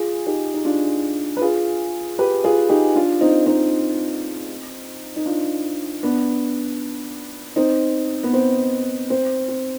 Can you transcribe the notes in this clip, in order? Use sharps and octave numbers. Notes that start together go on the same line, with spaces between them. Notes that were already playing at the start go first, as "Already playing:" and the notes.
Already playing: F4 G#4
D#4 G4
D#4
D4 F4
B4
F4 G#4
G4 B4
F4 G#4
D#4 G4
D4 F4
C4 D#4
C4 D#4
D#4
D4 F4
B3 D4
C4 D#4
B3
C4
C4
C4